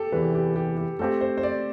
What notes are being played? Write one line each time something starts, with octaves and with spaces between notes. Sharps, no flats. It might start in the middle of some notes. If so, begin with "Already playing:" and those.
Already playing: G4 A4
E2 C3 E3 B4
G4
G4
G4
A3 C4 G4 A4
C5
C5
D5